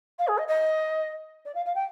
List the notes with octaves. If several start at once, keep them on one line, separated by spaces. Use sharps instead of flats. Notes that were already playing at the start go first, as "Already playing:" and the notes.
F5
G#4
D#5
D#5
D5
F5
F5
G5